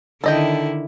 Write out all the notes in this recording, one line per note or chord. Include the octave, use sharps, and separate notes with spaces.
D3 D#3 E4 A4 D#5 G5